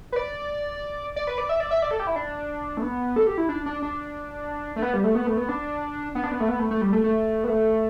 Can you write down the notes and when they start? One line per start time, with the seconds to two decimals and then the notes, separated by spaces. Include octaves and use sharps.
0.12 B4
0.16 D5
1.16 D5
1.27 B4
1.38 D5
1.49 E5
1.60 D5
1.71 E5
1.82 D5
1.91 A4
2.00 G4
2.07 E4
2.16 D4
2.77 A3
2.82 B3
3.16 A4
3.27 G4
3.38 E4
3.49 D4
3.66 D4
3.82 D4
4.76 A3
4.82 B3
4.94 G3
5.04 A3
5.15 B3
5.27 A3
5.37 B3
5.49 D4
6.15 B3
6.24 D4
6.31 B3
6.40 A3
6.48 B3
6.59 A3
6.71 A3
6.81 G3
6.93 A3
7.04 A3
7.44 B3
7.48 A3